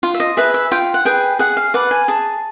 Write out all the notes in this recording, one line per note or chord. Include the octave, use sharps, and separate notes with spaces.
F4
E5
D#5
G#4 B4 E5
E5
F4 G5
F#5
G#4 B4 G5
G#4 F#5
F5
B4 D5 F#5
G#5
G#4 A5